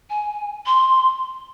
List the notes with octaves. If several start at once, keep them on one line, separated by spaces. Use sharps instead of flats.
G#5
C6